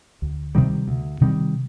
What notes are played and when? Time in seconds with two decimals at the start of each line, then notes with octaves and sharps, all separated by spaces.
0.22 D2
0.55 C3 D#3 G3
0.88 D2
1.21 C3 D#3 G3